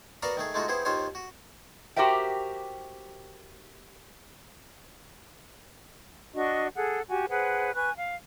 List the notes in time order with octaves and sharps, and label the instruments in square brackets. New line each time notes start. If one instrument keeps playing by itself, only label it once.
[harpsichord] B3 F#4 A#4 D5 F5 A#5
D#3 A3 G#4
G#3 A3 D#4 F4 F#4
B3 E4 G4 G#4 C5
D#2 D#3 F4 C5 C#5 G#5
F#4
[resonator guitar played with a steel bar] F#4 G4 A#4 C5 E5 G5
[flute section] D4 F#4 D#5 C#6
G#4 A4 F#5
F#4 G4 G#5
G#4 B4 C5 F#5
B4 G#5 C#6 F#6
F5